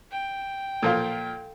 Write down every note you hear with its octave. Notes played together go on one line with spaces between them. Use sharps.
G5
A#2 F3 F4 A4 F5